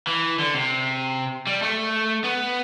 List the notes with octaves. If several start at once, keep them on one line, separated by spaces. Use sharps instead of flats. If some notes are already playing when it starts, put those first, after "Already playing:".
E3
D3
C3
G3
A3
B3